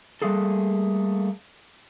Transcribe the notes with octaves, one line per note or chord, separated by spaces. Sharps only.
G3 A3 A#3 G#4 A4